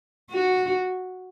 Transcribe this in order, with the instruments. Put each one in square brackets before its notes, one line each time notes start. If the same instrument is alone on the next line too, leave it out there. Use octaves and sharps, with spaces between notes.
[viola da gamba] F#4